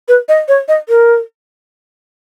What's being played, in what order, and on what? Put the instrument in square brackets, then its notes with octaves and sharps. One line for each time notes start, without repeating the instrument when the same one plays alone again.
[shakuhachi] B4
D#5
C#5
D#5
A#4